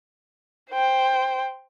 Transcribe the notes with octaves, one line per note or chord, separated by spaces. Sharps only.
C5 G5